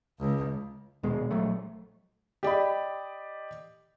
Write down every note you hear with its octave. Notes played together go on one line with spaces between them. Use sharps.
C#2
D#1 B2 G#3
A#1 F#3 A3
G4 D5 D#5 B5